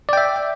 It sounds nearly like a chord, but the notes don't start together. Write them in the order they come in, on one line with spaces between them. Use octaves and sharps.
D5 G5 E5